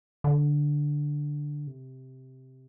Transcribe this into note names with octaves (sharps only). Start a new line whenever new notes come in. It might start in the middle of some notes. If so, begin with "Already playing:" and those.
D3
C3